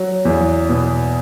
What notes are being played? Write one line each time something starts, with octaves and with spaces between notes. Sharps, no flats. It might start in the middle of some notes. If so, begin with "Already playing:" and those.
Already playing: F#3
E2
B2